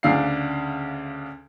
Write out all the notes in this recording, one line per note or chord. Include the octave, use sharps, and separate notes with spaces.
D2 C#3 D4 F5 C7